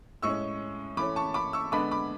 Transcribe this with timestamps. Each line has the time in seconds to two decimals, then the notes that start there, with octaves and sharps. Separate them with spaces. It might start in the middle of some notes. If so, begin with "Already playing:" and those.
0.22 A2 G#3 C#4 C#6 E6
0.97 E3 A3 C#4 B5 D6
1.16 A5 C#6
1.34 B5 D6
1.53 C#6 E6
1.72 D3 G#3 B3 D4 B5 D6
1.91 B5 D6